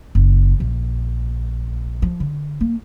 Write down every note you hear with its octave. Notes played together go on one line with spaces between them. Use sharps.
F#1
A#1
F3
D3
A#3